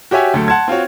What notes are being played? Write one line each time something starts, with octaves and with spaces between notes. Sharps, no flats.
F#4 G4 C#5 E5 G#5
D2 F#3 A3 A4
F#5 A5 C6 G#6
C4 F4 F#4 C#5